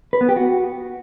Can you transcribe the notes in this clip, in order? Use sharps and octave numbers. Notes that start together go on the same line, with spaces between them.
B4
B3
G4
F#4